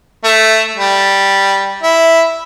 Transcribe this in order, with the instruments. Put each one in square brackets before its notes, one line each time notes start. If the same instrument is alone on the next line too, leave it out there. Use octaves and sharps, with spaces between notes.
[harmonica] A3
G3
E4